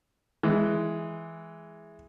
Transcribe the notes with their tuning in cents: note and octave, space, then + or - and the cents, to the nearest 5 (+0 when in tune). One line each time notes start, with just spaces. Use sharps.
E3 +0 G#3 +0